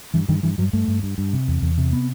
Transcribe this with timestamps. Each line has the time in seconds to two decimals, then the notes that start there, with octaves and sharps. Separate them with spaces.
0.14 G2 E3
0.28 G2 D#3
0.43 G2 E3
0.58 G2 F#3
0.73 G2 A3
0.88 G2
1.03 G2
1.18 G2
1.33 C3
1.48 E2
1.62 E2
1.78 C3
1.93 B3